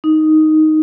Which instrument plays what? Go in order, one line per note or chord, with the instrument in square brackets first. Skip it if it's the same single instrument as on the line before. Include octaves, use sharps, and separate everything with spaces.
[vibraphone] D#4